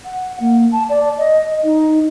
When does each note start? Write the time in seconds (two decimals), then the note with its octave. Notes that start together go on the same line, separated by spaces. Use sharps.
0.05 F#5
0.40 A#3
0.72 A5
0.89 D5
1.17 D#5
1.63 D#4